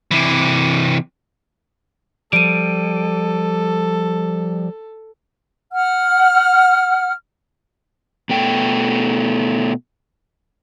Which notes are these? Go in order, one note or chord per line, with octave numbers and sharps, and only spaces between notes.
C3 E3
F3 G3 A4 D7 D#7
F#5 F6
B2 A3 G5